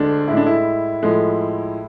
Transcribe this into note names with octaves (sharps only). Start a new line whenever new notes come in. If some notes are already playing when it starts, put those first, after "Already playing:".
Already playing: D2 D3 G#3 D4
A2 G#3 E4
D4
E4
A2 F3 G#3